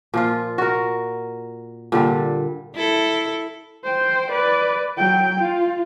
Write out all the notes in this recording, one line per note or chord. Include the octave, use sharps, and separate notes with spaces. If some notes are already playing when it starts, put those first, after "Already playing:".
A#2 F3 F4
F#4 A#4
A#2 D3 G3
E4 A4
C5 G5
B4 D5
F#3 G5
F4